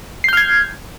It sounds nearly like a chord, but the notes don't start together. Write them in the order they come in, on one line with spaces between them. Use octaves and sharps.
C7 G6 F6 G#6